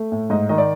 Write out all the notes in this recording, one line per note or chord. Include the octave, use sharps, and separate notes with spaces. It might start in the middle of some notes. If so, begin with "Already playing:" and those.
Already playing: A3
A2
G#2 D#5
D#3 D#5
D5